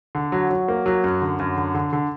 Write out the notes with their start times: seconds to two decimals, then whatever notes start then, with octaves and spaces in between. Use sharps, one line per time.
0.15 D3
0.32 F#3
0.50 F#3
0.68 A#3
0.86 F#3
1.04 F#2
1.22 D3
1.39 F#2
1.57 D3
1.75 D3
1.93 D3